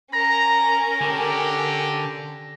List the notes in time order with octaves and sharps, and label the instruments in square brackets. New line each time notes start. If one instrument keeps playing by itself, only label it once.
[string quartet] C#4 A#4 [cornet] A#5 [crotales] A#6
[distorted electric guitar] D3 [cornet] G4